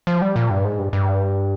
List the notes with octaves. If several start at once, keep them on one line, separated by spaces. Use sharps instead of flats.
F3
G3
A#2
G2
G#2
G2
G2